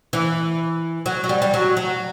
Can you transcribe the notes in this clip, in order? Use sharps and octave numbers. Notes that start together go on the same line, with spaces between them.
E3
F#3
F#3
G3
G3
F#3
F#3